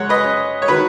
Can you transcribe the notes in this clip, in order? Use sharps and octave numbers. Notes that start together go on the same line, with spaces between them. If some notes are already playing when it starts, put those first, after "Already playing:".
Already playing: F#2 G#3 C#5 F#5
B4 D#5
C#4
C#5
D#3 F#4 B4